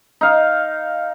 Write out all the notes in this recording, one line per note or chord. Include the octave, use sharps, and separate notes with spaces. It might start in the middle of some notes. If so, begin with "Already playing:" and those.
D#4 F5